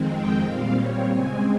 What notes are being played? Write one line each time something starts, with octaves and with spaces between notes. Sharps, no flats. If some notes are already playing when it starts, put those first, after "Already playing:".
Already playing: F2 D#3 G#3 C4
G5
A#2 G3 C4 F5
C#5
C#3 G#3 C4 G#5